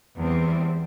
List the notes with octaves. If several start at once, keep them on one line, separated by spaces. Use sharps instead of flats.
E2 G3 C4